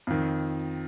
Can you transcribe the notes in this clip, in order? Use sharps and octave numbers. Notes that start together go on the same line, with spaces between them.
F2 D#3